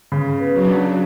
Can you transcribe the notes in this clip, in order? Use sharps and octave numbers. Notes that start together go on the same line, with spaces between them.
C#3
B3
F#3
D4